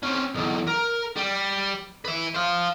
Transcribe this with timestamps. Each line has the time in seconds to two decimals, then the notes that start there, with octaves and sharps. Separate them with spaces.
0.03 C4 C#4
0.34 B1 E2
0.67 A#4
1.16 G3
2.05 B4 E5
2.34 C5 F5